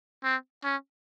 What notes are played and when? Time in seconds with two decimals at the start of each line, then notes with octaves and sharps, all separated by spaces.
0.24 C4
0.64 C#4